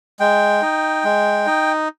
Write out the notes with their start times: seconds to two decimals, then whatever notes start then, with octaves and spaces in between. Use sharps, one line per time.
0.20 G#3 G5
0.62 D#4
1.04 G#3
1.46 D#4